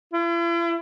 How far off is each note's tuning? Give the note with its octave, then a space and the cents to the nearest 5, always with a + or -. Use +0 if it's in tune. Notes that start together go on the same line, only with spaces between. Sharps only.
E4 +45